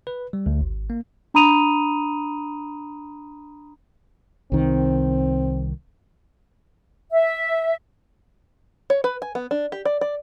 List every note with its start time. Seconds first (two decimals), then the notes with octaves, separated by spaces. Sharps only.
0.07 B4
0.33 G3
0.46 D2
0.61 G#1
0.90 A#3
1.34 D4 A#5 B5 D#6 D#7 F7
4.52 C2 D#3 C4
7.13 E5
8.90 C#5
9.04 B4
9.22 G#5
9.35 B3
9.51 D4
9.72 G4
9.85 D5
10.01 D5